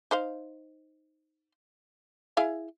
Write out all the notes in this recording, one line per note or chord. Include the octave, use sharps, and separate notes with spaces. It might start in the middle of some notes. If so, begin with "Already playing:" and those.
D#4 C5 F5
E4 G#4 F5